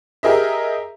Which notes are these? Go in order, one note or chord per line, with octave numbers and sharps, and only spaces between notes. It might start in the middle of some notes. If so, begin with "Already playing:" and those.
G4 G#4 A#4 D#5 E5